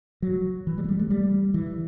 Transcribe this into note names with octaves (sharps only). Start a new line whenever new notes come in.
F#3
E3
G3
A3
G3
A3
G3
E3